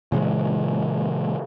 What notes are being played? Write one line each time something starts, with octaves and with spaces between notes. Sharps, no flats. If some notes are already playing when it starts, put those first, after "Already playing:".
A#2 C#3 E3 G#3